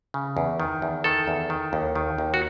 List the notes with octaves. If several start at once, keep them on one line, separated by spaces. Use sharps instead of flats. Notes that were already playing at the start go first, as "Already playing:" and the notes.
C#3
E2
D#3
E2
D#3 A4
E2
D#3
D#2
D#3
D#2
F#4